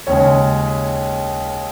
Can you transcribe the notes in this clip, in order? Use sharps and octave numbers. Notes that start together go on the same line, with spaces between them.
D#2 C#3 G#3 C#5